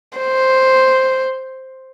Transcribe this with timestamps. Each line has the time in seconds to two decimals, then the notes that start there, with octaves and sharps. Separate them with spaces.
0.18 C5